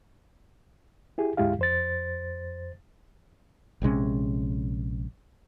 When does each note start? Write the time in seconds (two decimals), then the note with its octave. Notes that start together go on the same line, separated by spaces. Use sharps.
1.18 E4 G4 G#4
1.37 D2 G#2 G#3 E4 G4 F5
1.59 F2 C5 A6
3.82 A#1 C3 G#3 C#4